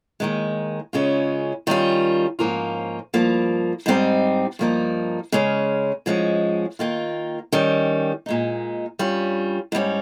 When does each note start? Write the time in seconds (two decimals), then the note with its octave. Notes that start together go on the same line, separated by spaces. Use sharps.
0.20 D#2 D#3 G#3
0.93 C#3 G#3 C#4 F4
1.67 D#3 G3 C#4 F4
2.39 G#2 F3 A#3 C#4 F4
3.14 G2 F3 A#3
3.86 G#2 G3 C4 D#4
4.59 G2 F3 A#3 D#4
5.32 C#3 G#3 C#4
6.06 G#2 F3 G#3 C#4
6.79 D#3 A#3 F4
7.52 D#3 G3 C#4
8.26 A#2 G#3 D#4
8.99 G2 G3 C#4 F4
9.72 G#2 G3 C#4